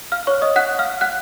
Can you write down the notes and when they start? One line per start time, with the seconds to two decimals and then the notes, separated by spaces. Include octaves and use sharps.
0.12 F5 F6
0.27 C#5 C#6
0.42 D#5 D#6
0.56 F#5 F#6
0.79 F5 F6
1.01 F#5 F#6